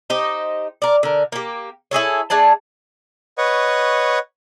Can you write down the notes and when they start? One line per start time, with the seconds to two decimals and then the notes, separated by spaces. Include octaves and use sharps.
0.10 D#4 G4 C5 D#5
0.82 A#4 D5
1.03 D3 A#4
1.32 A#3 G4
1.91 E4 G#4 A4 C#5
2.30 A3 D4 G#4 A5
3.38 B4 C#5 D#5 F#5 C#6